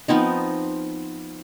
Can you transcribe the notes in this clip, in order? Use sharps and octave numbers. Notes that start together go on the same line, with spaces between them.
F3 B3 C4 D#4